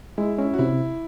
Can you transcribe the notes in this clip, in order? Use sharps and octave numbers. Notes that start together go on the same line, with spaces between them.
G#3 E4
C#4 E4
F#4
C3 E4